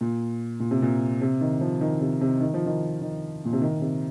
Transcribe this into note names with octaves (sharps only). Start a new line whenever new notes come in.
A#2
A#2
C3
A#2
C3
D#3
F3
D#3
C3
C3
D#3
F3
D#3
D#3
A#2
C3
D#3
C3